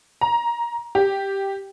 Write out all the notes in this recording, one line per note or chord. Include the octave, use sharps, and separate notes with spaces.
A#5
G4